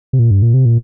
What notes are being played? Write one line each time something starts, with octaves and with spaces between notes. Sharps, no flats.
C3
A#2
G2
A#2
C3
A#2